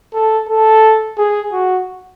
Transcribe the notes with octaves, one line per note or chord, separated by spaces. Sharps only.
A4
A4
G#4
F#4